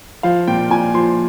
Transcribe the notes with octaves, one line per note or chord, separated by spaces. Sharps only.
F3 F5
A#2 G5
A#2 G#5
F3 C6